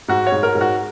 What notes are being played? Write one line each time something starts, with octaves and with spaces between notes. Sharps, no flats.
G#2 F#4
C#5
G#2
A#4
G#2
F#4